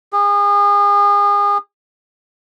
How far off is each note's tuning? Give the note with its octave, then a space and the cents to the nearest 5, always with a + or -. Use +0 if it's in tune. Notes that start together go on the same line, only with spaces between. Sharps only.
G#4 -35